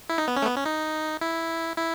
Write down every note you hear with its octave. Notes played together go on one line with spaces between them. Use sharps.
E4
D#4
B3
C#4
A3
B3
C#4
D#4
E4
E4